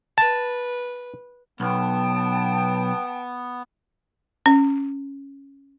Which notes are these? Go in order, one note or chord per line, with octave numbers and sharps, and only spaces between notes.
B4 A5
B1 B3 G5 A5
C#4